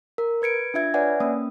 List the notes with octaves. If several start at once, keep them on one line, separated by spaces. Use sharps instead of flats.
A#4
B4 G#6 C#7 D7
D4 F4 E5 G#6
B4 C#5 D5 E5 F#5 G#5
A#3 C#4 D#6